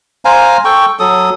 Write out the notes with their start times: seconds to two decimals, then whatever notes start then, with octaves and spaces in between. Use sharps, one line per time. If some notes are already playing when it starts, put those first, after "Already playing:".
0.25 C5 F5 G#5 A#5
0.65 A4 G5 C#6
0.99 F#3 A4 D#6